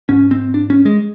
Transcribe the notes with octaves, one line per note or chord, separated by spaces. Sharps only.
G#2 C#4
C4
D4
C#4
G#3